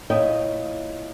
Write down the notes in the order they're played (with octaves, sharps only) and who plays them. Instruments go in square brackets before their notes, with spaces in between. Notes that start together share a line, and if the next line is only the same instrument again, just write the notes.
[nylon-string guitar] A#2 E4 C#5 D#5 G5